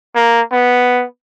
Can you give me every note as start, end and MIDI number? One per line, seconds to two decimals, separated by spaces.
0.15 0.41 58
0.52 1.05 59